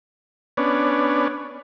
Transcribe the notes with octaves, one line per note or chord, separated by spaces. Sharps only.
B3 C#4 D4